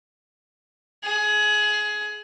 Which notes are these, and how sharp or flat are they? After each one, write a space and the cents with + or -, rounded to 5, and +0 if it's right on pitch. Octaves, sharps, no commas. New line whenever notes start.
G#4 +20